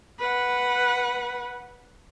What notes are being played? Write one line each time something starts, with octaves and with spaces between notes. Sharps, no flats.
B4 F#5